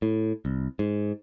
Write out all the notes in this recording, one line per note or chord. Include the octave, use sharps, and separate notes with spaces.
A2
C2
G#2